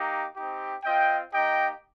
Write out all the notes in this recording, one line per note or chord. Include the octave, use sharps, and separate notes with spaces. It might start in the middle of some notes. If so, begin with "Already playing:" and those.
Already playing: A#3 D#4 G4
C4 D#4 G4
C4 F4 D#5 G5
A#3 D#4 G4 D#5 G5